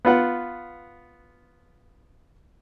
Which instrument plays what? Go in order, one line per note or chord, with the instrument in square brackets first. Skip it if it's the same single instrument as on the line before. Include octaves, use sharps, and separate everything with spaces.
[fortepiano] B3 F4 F#5